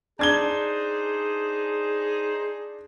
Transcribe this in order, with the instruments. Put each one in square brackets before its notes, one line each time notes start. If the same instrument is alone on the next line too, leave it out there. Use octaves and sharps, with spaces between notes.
[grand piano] D4 G#6 G7 [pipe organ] D#4 C5 [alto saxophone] G#4